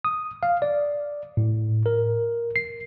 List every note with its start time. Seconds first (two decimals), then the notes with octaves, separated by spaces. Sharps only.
0.05 D#6
0.43 F5
0.62 D5
1.37 A2
1.86 A#4
2.56 C7